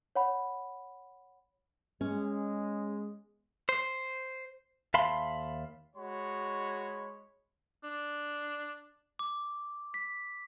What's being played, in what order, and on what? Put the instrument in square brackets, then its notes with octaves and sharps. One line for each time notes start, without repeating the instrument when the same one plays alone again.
[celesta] C#5 F#5 B5
[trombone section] G#3 [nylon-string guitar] C#4
[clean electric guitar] C5
D#2 E5 F5 A5 B5 C6
[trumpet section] G#3 F#4 C#5 B5
[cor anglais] D4
[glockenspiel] D6
B6